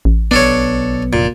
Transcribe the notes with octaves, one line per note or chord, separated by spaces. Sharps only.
A1
B1 B3 D4 A4 C#5
F1 A#1 A#2